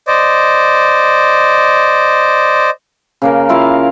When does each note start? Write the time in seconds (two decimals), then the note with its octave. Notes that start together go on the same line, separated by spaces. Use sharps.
0.07 C5 D5 D#5
3.22 C#3 A#3 A#4
3.49 E4 F4 A#4 F5